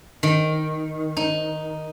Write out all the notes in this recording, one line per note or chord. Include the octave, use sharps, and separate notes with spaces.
D#3
D#4